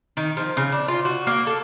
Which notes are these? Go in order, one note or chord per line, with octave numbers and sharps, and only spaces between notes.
D#3
F3
C#3
D4
F4
F#4
A#3
A4